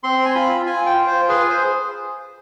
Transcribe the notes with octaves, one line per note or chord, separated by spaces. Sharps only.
C4 C6
G#5
F4 B5
F4 G#5
G5
F4
C5
G#4 B4
C5